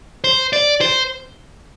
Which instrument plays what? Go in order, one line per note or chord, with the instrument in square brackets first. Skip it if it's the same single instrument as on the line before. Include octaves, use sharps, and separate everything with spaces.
[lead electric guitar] C5
D5
C5